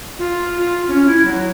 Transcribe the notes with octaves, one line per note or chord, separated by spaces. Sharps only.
F4
F4
C#4
E4
F#3